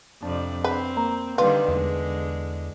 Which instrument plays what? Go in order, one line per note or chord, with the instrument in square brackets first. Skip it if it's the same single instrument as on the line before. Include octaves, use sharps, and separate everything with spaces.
[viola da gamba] F2 C3 D5 [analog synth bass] D4
[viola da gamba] C4 [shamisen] B4
[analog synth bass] A#3 [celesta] A#5
[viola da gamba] D3 D#3 G3 [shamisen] F4 [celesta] B4
[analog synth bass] E2 [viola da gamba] D3 G#3